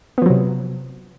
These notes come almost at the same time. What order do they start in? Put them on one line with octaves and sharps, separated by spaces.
B3 F3 F#3 C3